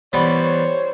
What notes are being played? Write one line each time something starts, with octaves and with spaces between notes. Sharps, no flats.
E3 G3 B3 C5 C#5